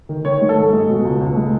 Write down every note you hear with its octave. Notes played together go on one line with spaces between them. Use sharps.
D#3
D#3 C#5
G#3
A4
G#2
G#3
B2
C#2
C#2
G#3